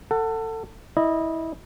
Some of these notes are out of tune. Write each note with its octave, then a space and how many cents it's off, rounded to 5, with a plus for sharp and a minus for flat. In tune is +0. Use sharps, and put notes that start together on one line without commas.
A4 +25 F#5 +0
E4 -25 D#5 -10